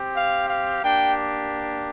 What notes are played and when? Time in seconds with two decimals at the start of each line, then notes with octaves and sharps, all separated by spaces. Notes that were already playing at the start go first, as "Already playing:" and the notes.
Already playing: C4 G4
0.16 F5
0.49 F5
0.82 A#3 D4 G4 G5